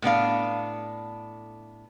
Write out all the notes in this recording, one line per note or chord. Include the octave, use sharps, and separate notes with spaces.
A2 B3 D4 F5